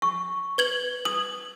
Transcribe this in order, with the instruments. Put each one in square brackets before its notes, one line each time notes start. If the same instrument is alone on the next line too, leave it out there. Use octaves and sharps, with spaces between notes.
[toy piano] C#6
[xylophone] B4 G#6 F#7
[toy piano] D#6 [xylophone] F#7